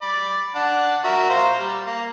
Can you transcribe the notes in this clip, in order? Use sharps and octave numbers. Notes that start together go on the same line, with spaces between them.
D5 B5
D4 D5 F#5
F#4 A#4 E5
C5 F5 A#5
G3
A#3